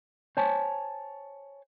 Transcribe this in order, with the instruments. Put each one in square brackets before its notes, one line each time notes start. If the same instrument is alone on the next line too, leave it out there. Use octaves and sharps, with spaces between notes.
[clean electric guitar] C5 C#5 G#5 A5